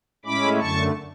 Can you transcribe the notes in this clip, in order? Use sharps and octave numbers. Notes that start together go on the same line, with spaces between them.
A2 G#3 C#4 E4 B5 D6
F#2 D3 A3 A5 C#6